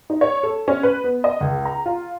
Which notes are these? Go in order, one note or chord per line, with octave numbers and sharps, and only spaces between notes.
D#4
C#5
A4
C#4
B4
B3
D#5
C#2
A#5
F4